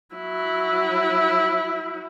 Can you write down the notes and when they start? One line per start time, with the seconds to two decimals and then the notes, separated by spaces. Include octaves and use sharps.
0.16 F#3 E4